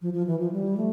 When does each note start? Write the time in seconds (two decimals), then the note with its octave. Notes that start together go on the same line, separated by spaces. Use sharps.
0.02 F3
0.14 F3
0.27 E3
0.40 F3
0.52 G3
0.77 A3